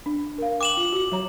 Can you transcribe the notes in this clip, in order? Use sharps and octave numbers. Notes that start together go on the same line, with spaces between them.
D4
A#4 F5
G5 D6 E7 F#7
F4
F#4
F#3 C#5 A#5